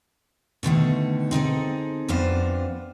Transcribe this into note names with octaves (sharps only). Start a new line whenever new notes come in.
B2 D3 D#3 A3
C4 D#4 G#4 A4
F2 B3 D4 F4 C5